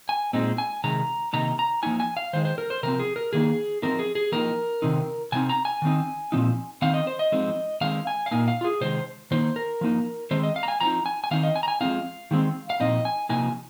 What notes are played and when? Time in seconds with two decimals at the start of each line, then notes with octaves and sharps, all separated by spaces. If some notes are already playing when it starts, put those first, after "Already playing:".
0.09 G#5
0.33 A#2 G#3 C4 D#4
0.58 G#5
0.84 C3 D#3 G#3 A#5
1.33 C3 D#3 A#3 D#4 A#5
1.59 A#5
1.83 F3 A#3 D#4 G#5
2.00 G#5
2.17 F5
2.33 D#3 G#3 D#4 C5
2.45 C5
2.58 A#4
2.70 C5
2.83 C3 F3 C4 A#4
2.99 G#4
3.16 A#4
3.33 D#3 A#3 D#4 G#4
3.82 F3 C4 D#4 A#4
3.99 G#4
4.15 G#4
4.32 F3 A#3 D#4 A#4
4.82 C3 D#3 C4 D#4
5.32 C3 F3 C4 D#4 G#5
5.49 A#5
5.65 G#5
5.82 D#3 C4 D#4
6.32 A#2 F3 C4 D#4
6.82 D#3 C4 D#4 F5
6.94 D#5
7.07 C5
7.19 D#5
7.32 F3 G#3 C4 D#4
7.81 D#3 G#3 C4 D#4 F5
8.07 G#5
8.26 F5
8.31 A#2 A#3 D#4 G#5
8.48 F5
8.61 F4
8.64 G#4
8.81 C3 D#3 G#3 D#4 C5
9.31 D#3 A#3 D#4 C5
9.56 A#4
9.81 F3 A#3 D#4
10.31 D#3 G#3 C4 C5
10.43 D#5
10.56 F5
10.63 A#5
10.68 G#5
10.81 F3 C4 D#4 A#5
11.06 G#5
11.24 G#5
11.31 D#3 C4 D#4 F5
11.43 D#5
11.56 G#5
11.63 A#5
11.68 G#5
11.81 F3 G#3 C4 D#4 F5
12.31 D#3 G#3 C4
12.70 F5
12.80 A#2 F3 C4 D#4 D#5
13.05 G#5
13.29 C3 F3 A#3 D#4 G#5